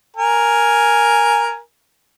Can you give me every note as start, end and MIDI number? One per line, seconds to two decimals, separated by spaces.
0.16 1.58 70
0.16 1.58 80